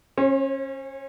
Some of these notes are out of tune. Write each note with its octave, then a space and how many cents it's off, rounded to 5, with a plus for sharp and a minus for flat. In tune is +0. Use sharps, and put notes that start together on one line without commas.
C#4 -25 C5 +40